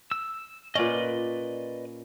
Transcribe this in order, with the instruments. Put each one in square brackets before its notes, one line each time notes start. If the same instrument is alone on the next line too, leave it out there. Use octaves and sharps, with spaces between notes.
[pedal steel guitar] E6
[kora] A#2 C#4 [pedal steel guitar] B4 D5 D#5